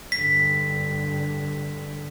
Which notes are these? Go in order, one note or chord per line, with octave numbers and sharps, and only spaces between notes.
G2 D3 B6